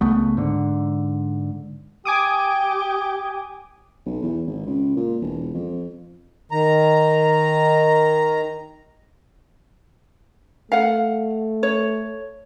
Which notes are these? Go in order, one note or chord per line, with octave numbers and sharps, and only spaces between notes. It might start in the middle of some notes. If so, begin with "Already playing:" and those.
C#2 A3 B3
G#2 D3
G4 G#5 D6 D#6
B1
E2
G#1
C#2
A#2
E1
F2
D#3 A#5
A3 F5 F#5
C#5